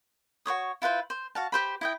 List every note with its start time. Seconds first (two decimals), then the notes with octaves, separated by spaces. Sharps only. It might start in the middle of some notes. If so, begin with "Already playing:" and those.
0.46 F#4 C5 C#5 D#6
0.82 E4 F4 B4 C5
1.10 C5
1.35 F#4 F5 A5
1.52 G4 C5 B5
1.81 E4 D#5 G5